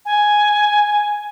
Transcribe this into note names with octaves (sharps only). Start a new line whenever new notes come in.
G#5